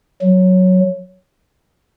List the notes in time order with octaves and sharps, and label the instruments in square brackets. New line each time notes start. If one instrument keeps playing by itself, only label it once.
[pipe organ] F#3